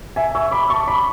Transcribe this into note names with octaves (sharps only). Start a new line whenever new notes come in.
E5 G#5
C#6 E6
B5 D6
A5 C#6
B5 D6